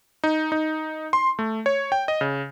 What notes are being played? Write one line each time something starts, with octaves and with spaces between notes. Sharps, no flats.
D#4
D#4
C6
A3
C#5
G5
D#5
C#3